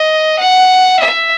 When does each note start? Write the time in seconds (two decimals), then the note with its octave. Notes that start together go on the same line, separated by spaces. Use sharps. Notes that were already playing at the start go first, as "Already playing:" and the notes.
Already playing: D#5
0.39 F#5
1.00 E5